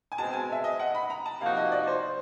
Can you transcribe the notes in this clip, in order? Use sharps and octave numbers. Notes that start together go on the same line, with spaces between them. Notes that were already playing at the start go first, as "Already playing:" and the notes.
G#5
B2 G#3 C4 A5
G#5
E5
D#5
F#5
B5
A#5
A5
C3 F3 A#3 D#4 F#4 F5
D#5
D5
C5